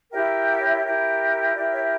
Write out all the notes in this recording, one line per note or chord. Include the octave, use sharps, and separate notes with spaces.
E4 G4 A#4 E5 G5
F#5
C#5 E5
E4 G4 A#4
E4 G4 A#4 D5
C#5 E5